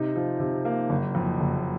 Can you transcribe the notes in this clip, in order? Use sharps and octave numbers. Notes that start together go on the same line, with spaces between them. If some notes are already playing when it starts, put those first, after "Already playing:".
Already playing: C3 D#4
F3
C3
A#3
F#1
F2
F#1